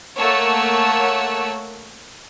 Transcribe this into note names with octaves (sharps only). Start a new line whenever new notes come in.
A3 A#3 C#5 F#5 A5 E6